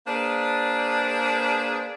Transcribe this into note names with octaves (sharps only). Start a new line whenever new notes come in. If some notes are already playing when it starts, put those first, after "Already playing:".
A#3 D4 G#4 B4 C5 D5